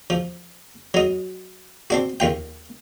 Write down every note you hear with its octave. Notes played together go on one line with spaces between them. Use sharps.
F3
F#3 D#4
C4 D4 F#4
D#2 F4 G5